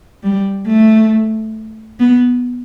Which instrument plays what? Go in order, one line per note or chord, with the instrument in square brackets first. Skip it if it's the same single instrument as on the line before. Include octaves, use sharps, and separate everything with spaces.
[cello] G3
A3
B3